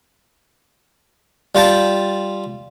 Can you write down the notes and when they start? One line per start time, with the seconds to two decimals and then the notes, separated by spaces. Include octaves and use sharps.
1.55 G3 F4 G5 A5